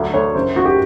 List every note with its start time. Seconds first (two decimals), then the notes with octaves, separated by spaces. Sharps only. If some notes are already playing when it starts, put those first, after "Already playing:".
Already playing: D2 F#3
0.14 D2 C#5
0.35 F#1 C5
0.56 F#1 F#4
0.65 G4